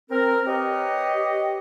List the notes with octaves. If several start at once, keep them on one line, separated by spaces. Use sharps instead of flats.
C4 A#4
G4 B4 C#5 D#5